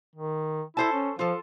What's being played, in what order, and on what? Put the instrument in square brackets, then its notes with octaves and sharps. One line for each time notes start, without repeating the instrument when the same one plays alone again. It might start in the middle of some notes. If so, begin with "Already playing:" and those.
[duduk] D#3
[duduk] E4 [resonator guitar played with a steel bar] A4 C5 A5
[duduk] C#4
[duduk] F3 [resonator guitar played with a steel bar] F4 A4